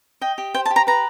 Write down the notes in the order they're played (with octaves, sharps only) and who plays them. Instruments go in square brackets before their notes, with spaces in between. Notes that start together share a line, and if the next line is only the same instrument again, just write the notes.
[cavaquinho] D#5 G5
G4
C5 G5
A5
G4
A#5
B4 A#5